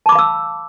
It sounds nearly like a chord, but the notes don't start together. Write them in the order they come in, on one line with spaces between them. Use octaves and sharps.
A5 D6 B5 F5 E6